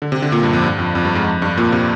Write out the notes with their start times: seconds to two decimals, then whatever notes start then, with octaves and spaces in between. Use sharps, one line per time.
0.02 D3
0.12 C3
0.22 D3
0.32 A#2
0.43 G2
0.53 F2
0.64 G2
0.79 F2
0.95 F2
1.05 G2
1.15 G#2
1.26 F2
1.42 G2
1.57 A#2
1.72 C3